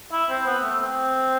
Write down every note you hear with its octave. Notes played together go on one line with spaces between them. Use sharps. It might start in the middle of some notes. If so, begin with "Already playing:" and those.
E4
C4
B3
A3
C4